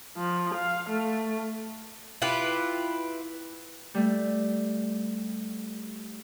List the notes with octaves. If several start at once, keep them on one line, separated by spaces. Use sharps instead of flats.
F3
F5
A3
E4 F4 G4 B4
G3 A3